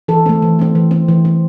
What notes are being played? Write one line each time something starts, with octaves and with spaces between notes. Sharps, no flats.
E3 A4
A3 C4
E3
A3 C4
E3
C4
E3
C4